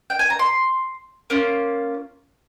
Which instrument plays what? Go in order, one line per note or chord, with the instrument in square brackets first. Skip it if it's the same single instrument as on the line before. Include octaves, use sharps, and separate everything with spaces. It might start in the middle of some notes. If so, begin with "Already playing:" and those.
[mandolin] G5
G#5
A#5
C6
A#3 C#4 F4